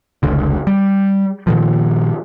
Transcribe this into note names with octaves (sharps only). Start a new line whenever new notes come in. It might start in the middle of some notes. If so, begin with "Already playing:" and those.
F1 C#2 D3
G3
A#2 D#3 F3